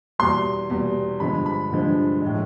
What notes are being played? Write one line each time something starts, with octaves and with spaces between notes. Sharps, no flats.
E2 B2 G3 C6
E2 B2 G3
G2 D3 F3 G#3 B5
B5
G2 D3 F3 G#3
A2 F3 G#3